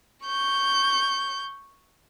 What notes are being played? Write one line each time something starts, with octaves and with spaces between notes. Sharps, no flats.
C#6 G6